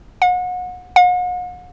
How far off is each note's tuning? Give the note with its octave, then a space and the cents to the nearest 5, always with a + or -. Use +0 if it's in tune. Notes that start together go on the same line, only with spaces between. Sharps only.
F#5 -35
F#5 -45